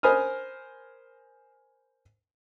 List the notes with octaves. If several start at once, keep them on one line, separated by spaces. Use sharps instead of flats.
A#4 C5 G#5 B5 D#6 F6